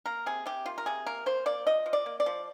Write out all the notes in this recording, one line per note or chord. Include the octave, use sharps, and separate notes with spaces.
A#3 A#4
C3 G#4
C3 G4
A#3 F4
A#4
C3 G#4
A#3 A#4
A#3 C5
A#3 D5
F3 D#5
F3
D5
A#3
D5
F3